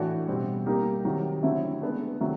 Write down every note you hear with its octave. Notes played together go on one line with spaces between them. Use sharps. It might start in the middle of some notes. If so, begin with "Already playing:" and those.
Already playing: A2 E3 A3 D4 F#4
B2 G3 C4
G3 A#3 D#4 G4 A#4
C3 D#3 F#3
D3 F#3 A3 C4 E4
G#3 B3 D4
C3 D#3 F#3 A3